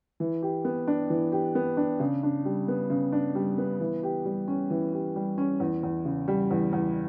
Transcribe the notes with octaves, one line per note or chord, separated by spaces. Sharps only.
E3
G4
B3
D4
E3
G4
B3
D4
C#3
D4
G3
B3
C#3
D4
G3
B3
E3
G4
G3
C#4
E3
G4
G3
C#4
E2
E2
C#3
G3
E2
E2